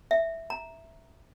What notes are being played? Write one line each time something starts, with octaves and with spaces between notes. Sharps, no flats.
E5
A#5